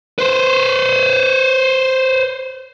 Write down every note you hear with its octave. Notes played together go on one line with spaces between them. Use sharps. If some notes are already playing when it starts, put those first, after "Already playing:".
B4 C5